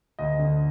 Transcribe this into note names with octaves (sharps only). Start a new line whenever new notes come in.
D2 D#5
D3